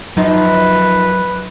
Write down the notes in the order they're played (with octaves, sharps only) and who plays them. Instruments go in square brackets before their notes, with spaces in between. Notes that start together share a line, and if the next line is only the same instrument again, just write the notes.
[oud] F#2 F3 D#4 [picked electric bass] F#3 [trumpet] B4